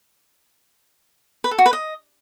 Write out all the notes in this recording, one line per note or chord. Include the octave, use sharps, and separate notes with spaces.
B4
A4
F#4
B4
D#5